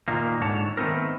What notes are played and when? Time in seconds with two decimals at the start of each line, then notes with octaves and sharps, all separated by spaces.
0.08 A#2 D#3 A#3
0.41 G#2 D3 C#5 A5
0.77 D#3 A3 B3 C4 A#4